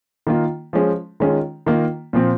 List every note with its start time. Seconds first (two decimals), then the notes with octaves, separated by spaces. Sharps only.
0.27 D#3 A#3 F4
0.73 F3 G#3 C#4
1.20 D#3 G#3 C#4 F4
1.66 D#3 A#3 F4
2.13 A#2 F3 C4 F4